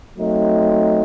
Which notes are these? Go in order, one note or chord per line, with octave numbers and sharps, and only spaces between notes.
F#3 A3 C4 D#4